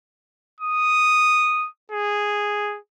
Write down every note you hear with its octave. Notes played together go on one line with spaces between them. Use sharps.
D#6
G#4